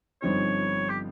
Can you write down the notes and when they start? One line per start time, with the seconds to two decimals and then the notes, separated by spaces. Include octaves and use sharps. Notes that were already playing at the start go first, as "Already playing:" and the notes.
0.22 G1 G2 F3 C4 D#4 C#5
0.89 G4